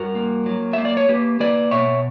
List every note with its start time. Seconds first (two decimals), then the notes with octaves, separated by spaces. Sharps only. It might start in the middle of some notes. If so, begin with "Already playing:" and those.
Already playing: G2 F#4 A#4
0.15 A#3
0.46 F#3
0.73 A#3 E5
0.85 D5
0.97 C#5
1.09 A#3 G4 B4
1.40 A#3 B4 D5
1.71 B2 C#5 E5